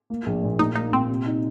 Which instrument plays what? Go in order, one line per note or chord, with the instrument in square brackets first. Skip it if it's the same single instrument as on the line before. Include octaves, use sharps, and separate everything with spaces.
[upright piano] A#3
A#1
A#2
[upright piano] A#2 [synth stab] D#4
[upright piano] A#3 [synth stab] D#4
[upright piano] A#2 [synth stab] C4
[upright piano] C3
D#4